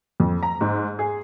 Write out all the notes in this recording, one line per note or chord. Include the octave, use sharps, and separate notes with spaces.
F2
A#5
G#2
G#4